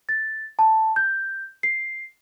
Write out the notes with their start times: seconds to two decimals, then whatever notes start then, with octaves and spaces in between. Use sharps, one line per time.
0.09 A6
0.59 A5
0.96 G6
1.63 C7